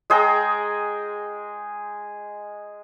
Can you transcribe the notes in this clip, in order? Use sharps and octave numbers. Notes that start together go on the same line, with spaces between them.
G#3 G#4 G5 A#5